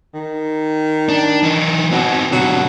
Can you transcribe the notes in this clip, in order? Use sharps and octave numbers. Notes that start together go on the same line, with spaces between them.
D#3
D4
E3 D#4
B2 C4 D#4
B2 D3 F#3